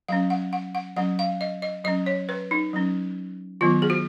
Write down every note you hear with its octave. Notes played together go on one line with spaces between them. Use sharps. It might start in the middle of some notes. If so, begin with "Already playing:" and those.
F#3 C#4 F5
F#5
F#5
F#5
F#3 C#4 F#5
F5
D#5
D#5
F#3 C#4 D#5
C#5
B4
D#4
F#3 C#4
D#3 F#3 B3 F4
G#4
F#4